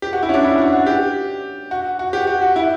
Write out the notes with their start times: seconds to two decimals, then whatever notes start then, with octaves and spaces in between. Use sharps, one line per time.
0.02 G4
0.13 F#4
0.23 E4
0.29 C#4
0.34 D4
0.44 E4
0.58 F#4
0.72 F#4
0.86 G4
1.71 F#4
1.99 F#4
2.13 G4
2.27 F#4
2.42 F#4
2.56 E4